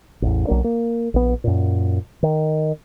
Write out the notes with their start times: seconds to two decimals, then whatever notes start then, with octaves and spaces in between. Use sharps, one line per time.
0.22 A1 E2
0.47 B1 F#3 A#3 D4
0.64 A#3
1.14 A#1 B3
1.44 F#2 A#2
2.23 D#3